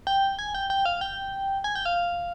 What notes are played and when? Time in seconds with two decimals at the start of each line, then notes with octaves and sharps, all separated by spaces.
0.07 G5
0.39 G#5
0.55 G5
0.70 G5
0.85 F5
1.01 G5
1.64 G#5
1.75 G5
1.85 F5